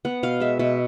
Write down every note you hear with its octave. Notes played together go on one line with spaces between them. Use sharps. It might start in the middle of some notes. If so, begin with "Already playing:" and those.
B3 F#5
B2 F5
G#3 E5
B2 E5